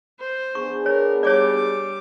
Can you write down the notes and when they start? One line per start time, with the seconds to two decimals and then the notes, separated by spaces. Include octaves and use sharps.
0.20 C5
0.55 B3 D4 G#4 C#6
0.86 A#4 C#5
1.23 G3 C#5 D5 D6